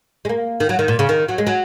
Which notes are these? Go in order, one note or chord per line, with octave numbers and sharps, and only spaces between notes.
G#3
A#3
D#3
F#3
D#3
A#2
C#3
D#3
F#3
G#3
F#3